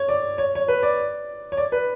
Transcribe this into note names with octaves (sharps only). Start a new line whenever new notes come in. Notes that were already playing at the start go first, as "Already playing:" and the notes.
Already playing: C#5
D5
C#5
C#5
B4
D5
C#5
D5
B4